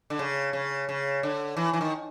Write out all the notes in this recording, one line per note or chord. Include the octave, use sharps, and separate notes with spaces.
D3
C#3
C#3
C#3
D3
E3
E3
D#3